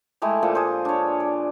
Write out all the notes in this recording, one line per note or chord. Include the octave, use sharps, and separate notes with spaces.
G#3 A3 E4 G4
A#2 F3 A4 A5
G#4 C5
D4 C#5
D5